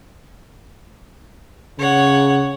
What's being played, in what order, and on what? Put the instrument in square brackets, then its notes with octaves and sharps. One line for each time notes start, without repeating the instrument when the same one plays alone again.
[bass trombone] C#3 [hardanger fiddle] C#5 F#5